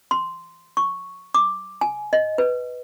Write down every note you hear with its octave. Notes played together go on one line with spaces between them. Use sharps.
C6
C#6
D6
G#5
D#5
B4